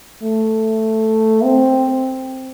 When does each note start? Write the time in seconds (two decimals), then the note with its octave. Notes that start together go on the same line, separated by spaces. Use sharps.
0.23 A3
1.44 C4